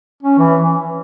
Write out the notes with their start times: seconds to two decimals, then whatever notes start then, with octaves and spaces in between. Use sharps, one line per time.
0.23 C#4
0.38 E3